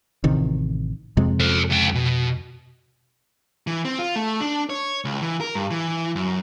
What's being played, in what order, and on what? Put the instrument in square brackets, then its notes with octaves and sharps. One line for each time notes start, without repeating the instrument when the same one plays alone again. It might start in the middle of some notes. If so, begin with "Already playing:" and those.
[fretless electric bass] A1 C3 D#3
F2 C3 G#3
[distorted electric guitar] A4 C5
C#2 G5
B2
[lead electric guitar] E3
C4
F4
A3
D4
C#5
C#2
E3
A#4
G2
E3
F#2